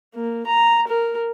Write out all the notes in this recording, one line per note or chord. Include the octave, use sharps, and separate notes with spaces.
A#3
A#5
A#4